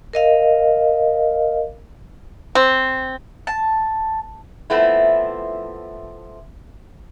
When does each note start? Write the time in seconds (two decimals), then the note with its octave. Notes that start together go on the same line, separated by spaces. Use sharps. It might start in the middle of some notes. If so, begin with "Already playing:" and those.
0.13 A#4 D#5 F5
2.55 C4
3.47 A5
4.70 F3 A3 B3 C4 E4